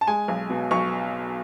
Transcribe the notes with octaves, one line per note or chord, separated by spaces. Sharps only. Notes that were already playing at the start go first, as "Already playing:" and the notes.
A5
G#3 G#5
B1
B2
B1 C#6